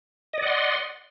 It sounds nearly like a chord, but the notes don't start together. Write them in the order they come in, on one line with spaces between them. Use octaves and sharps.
D#5 D5 F#5 C6